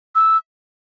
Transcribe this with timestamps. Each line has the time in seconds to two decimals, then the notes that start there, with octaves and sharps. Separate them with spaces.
0.15 E6